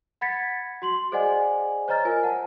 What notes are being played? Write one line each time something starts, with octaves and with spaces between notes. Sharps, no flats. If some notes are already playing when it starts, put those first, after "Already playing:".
F#5 B5 G#6 A6 B6 C#7
F#4 C6 F#7
G#4 C5 D5 D#5 F#5 G#5
C5 C#5 D#5 A#5 F6 A6
F4 A#4 G#5
F#5 A5